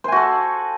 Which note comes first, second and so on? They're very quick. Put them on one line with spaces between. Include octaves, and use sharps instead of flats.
C5 G#5 F#4 A4